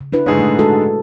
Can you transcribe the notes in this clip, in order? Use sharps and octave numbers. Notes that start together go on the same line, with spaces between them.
C#3
D4 E4 B4
G#2 D3 G#3 G#4 C#5
A#2 A3
G#3 F#4 A4